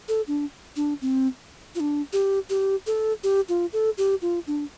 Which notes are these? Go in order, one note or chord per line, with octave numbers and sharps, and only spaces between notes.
A4
D4
D4
C4
F4
D4
G4
G4
A4
G4
F4
A4
G4
F4
D4